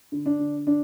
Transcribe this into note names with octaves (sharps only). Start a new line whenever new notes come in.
D3
D4
D3
D4